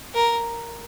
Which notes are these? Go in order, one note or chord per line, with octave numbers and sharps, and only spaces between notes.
A#4